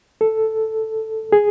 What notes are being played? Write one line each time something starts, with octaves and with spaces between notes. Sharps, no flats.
A4
G#4